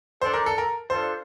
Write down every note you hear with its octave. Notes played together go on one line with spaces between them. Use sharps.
D4 A4 C5 D5
A#4
A4
A#4
D4 F4 A4 C5